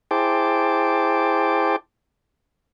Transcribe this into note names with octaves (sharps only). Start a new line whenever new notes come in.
E4 G#4 C5 G5 A5 D6